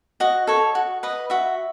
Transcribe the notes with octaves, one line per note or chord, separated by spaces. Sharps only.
F#4 D#5
A4 C#5
F#4
B4 D#5
F#4 E5